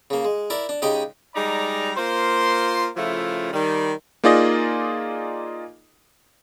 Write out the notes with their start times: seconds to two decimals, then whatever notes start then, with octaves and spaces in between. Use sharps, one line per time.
0.10 C#3 A#3
0.25 G#3
0.50 E4 A#4 D5
0.69 D4
0.82 C#3 G#3 D#4 G4 G5
1.35 G3 G#3 D#4 D5 A#5
1.97 A#3 F4 C5 C6
2.97 C#3 F3 A3 E4 F4
3.53 D#3 G3
4.24 A#3 D#4 F4 G#4 D5 D#5